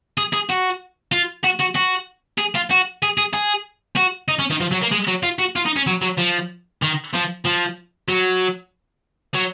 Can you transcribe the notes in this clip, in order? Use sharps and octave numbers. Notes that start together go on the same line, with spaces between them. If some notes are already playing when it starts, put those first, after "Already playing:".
G#4
G#4
F#4
F4
F#4
F#4
F#4
G#4
F4
F#4
G#4
G#4
G#4
F#4
D#4
C#4
D#3
F3
F#3
A#3
G#3
F#3
F4
F#4
F4
D#4
C#4
F#3
F#3
F3
D#3
F3
F3
F#3
F#3